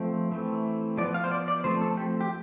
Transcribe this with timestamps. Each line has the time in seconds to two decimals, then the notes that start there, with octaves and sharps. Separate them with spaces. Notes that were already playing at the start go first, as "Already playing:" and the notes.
Already playing: F3 A3 C4
0.31 E3 A3 C4
0.98 F3 B3 D5
1.14 F5
1.24 C5
1.31 D5
1.48 D5
1.64 F3 A3 C4 C5
1.81 A4
1.97 G4
2.21 G4